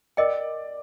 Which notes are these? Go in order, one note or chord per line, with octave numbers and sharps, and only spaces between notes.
A#4 D5 D#5 G5